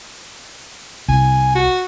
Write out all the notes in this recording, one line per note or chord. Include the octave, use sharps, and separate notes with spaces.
C2 G#5
F#4